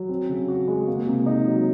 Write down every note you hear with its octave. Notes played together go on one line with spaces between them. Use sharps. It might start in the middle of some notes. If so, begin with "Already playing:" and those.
Already playing: F#3
C4
C#3
F#4
G#3
A#3
C3
D#4
F#3